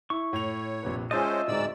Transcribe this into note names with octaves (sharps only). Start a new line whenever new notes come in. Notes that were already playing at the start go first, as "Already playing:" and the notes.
E4 C#6
A2 C#5 F7
A#1 C3 B4
G#3 C#4 F4 C5 D#5 E5 A5 A6
D1 G#2 G#3 D5 E6